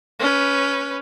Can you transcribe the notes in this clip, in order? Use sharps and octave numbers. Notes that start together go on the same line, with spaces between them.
C#4 B4